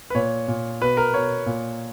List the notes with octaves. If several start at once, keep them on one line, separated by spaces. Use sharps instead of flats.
B4
A#2 C#5
A#2
B2 B4
A#4
B2 C#5
A#2